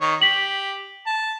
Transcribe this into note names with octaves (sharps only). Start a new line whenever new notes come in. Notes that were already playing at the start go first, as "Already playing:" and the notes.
D#3 C#5
G4 B6 F#7
A5